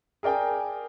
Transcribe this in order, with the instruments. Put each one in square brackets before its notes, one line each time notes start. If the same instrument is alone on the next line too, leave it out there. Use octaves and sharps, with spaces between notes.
[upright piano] G#4 A#4 D5 G5 G#5